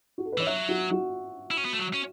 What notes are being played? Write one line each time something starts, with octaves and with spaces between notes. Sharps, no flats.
F#4
A4
B4
E3 C#5
F#3 E5
F#4
F#4
E4
C#4
B3
A3
F#3
C#4